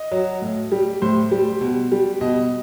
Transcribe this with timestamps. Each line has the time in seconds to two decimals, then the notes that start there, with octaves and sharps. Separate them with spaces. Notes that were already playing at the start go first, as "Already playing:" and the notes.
Already playing: D#5
0.12 F#3
0.42 A2
0.72 G3
1.02 A2 C5
1.32 G3
1.61 B2
1.92 G3
2.21 B2 D#5